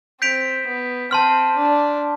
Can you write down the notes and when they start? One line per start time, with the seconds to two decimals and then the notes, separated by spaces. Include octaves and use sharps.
0.21 C4 G6 B6 D7 F7
0.67 B3
1.11 C4 A5 C6 F6
1.57 D4